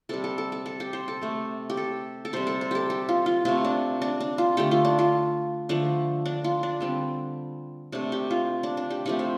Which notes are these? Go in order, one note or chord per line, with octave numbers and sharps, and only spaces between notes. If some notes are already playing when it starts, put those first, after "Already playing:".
C3 G3 A4
A4
A4
A4
A4
G4
C5
A4
C3 A3
G4
A4
A4
C3 G3 C5
A4
C5
G4 A4
G4
F4
F4
C3 A3 F4
D4
D4
D4
F4
D3 A3 G4
F4
D4
F4
D3 F3 A3 D4
D4
F4
D4
D3 G3 C4
C3 A3 D4
G4
F4
D4
D4
G4
C3 F3 A3 G4
C5